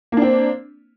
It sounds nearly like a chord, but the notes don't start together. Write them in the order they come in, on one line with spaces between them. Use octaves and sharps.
A#3 D4 C4